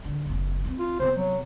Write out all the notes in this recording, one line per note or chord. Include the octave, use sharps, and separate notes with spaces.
D3
F#1 F2
C4 E4
F4
C3 B3 C5
F#3